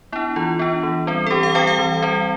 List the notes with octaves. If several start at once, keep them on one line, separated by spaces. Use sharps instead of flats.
B3 D4 E4
E3 F4
B3 D4
E3
G3 C4
A4
E3 G4
F5
G3 C4 G5
F5
E3
G3 C4